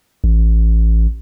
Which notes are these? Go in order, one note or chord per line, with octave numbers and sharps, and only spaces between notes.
A1